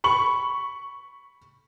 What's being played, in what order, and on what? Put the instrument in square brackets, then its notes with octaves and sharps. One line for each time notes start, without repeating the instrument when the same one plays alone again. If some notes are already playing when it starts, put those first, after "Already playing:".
[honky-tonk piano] B5 C#6 F#7